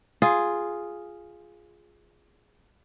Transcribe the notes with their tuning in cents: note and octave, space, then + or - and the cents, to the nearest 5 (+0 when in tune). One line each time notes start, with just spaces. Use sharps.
F4 +0 G#4 +0